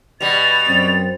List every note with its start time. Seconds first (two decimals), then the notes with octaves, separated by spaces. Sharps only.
0.21 B2 G3 A6 F7
0.68 F#2 C4